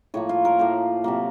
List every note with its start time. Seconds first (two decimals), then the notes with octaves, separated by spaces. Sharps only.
0.14 A2 F3 A#3 C#5
0.29 F4
0.45 A#4
0.59 A2 F3 A#3 C5
1.04 C3 F#3 A#3